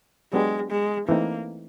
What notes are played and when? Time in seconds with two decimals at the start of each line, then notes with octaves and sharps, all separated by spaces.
0.33 F#3 G#3 B3 D4 G4 B4
0.71 G#3
1.08 E3 A3 A#3 C4 D#4